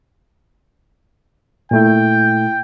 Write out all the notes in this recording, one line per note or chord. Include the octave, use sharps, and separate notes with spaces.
A#2 A3 E4 G5